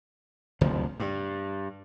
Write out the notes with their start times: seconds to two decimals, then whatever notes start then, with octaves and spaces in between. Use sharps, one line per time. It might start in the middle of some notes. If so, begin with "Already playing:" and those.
0.61 F#1 D2 C3 F3
1.00 G2